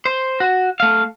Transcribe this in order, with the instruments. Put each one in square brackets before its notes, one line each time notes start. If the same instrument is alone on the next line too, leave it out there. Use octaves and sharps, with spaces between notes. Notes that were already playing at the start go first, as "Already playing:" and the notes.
[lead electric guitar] C5
F#4
A3 F5